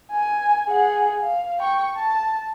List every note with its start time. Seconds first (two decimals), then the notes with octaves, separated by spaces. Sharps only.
0.11 G#5
0.70 G#4 F#5
1.22 F5
1.59 G5 C#6
1.96 A5